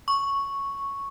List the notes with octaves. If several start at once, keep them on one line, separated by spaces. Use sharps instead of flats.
C#6